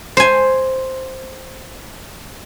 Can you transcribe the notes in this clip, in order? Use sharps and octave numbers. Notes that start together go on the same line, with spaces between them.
C5 G#5